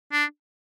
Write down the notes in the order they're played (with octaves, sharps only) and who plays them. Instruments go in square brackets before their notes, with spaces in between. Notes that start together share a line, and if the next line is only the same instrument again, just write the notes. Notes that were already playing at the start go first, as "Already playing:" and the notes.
[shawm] D4